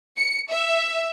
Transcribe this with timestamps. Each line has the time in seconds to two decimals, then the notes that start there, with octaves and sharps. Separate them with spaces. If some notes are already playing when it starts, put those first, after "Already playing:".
0.17 C#7
0.49 E5